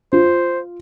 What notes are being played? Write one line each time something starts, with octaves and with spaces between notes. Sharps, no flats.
F4 C5